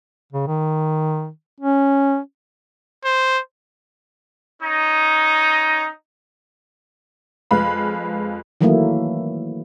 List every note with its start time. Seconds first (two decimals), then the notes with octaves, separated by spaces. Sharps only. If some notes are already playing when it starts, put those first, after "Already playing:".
0.33 C#3
0.47 D#3
1.60 C#4
3.05 C5
4.63 C#4 D#4
7.51 F2 G#3 B4 F5 B5
8.61 D#3 E3 F#3 A3 A#3 E4